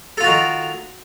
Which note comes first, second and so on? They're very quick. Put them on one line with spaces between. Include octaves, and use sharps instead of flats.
A4 F4 F#4 D#3